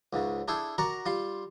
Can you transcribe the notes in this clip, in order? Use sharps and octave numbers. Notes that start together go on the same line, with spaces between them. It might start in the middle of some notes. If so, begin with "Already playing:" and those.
C#2 G#2 C#3
D4 E4 G#4 A4 G5
F#4 A#4 D5 F#5 A#5
G3 F4 C6